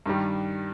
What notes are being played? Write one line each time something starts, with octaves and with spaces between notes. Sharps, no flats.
G2 D#3 G3